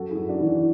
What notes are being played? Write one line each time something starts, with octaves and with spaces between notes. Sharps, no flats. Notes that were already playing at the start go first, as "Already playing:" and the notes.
Already playing: F#2 F#4 A4
E4 G#4
F#2
D4 F#4
E3